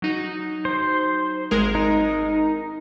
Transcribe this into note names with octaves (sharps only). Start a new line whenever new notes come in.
F#3 D#4 F#4
C5
G#1 G#3 A#4
D#4